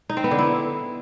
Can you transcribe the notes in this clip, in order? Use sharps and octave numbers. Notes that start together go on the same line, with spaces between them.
D#4
C4
B3
D3
E4